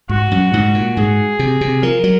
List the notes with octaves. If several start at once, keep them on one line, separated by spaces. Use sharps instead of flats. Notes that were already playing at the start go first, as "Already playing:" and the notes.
G#2 F#4
F#2
G#2
A#2
G#2 G#4
C3
C3
F3 A#4
F#3